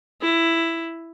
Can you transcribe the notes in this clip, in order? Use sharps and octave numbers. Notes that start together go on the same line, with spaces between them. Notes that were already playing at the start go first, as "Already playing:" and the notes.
E4